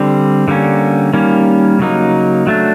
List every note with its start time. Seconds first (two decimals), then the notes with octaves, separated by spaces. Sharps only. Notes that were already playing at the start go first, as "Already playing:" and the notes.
Already playing: D3 G3 C4
0.48 D3 G3 A#3 C#4
1.13 D#3 G3 A#3 C#4
1.79 C#3 F#3 A#3 D#4
2.47 F#3 A3 D4